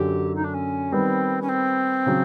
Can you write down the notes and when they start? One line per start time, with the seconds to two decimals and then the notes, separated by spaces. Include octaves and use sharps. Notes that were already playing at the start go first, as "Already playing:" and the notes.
Already playing: F#2 D3 F#3 G4
0.35 D#4
0.44 D4
0.54 C#4
0.92 D#3 G3 B3 C4
1.42 C#4
1.49 C4
2.06 C#3 F#3